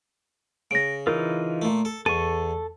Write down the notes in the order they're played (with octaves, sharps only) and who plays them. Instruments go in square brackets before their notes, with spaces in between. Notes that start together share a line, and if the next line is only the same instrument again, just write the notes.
[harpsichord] C#3 [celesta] A#6 D7
[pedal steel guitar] E3 D#4 F4 [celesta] A#4
[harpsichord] A#2 A3
A4
[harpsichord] E2 [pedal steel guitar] A4 C#6 [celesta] D#7